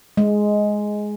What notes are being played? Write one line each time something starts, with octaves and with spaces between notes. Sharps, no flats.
G#3